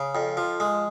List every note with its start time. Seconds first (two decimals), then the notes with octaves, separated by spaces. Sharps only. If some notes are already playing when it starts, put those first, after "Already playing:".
Already playing: C#3
0.15 F2
0.37 F3
0.60 G#3